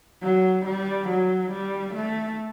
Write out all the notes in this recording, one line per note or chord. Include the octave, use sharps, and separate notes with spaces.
F#3
G3
F#3
G3
A3